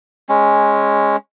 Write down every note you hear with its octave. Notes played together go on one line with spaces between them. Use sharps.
G#3 C#4